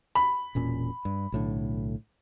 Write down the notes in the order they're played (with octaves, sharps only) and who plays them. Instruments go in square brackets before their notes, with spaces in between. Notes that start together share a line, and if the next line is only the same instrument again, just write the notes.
[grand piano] B5
[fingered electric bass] E1 A#2 C#4
G2
B1 A2 D3